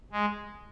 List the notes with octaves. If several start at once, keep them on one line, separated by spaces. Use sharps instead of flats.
G#3